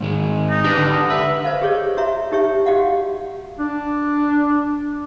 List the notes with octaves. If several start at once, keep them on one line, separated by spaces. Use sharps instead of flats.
G#2 D#3 G#3
D#4
D4 G4 B4
D3
B4 E5
B4 C5 D#5 F5
G4 G#4 C#5 D#5
F#4 C#5 E5 A#5
D#4 G4 C#5 E5
F#4 G4 D#5 F5 F#5
D4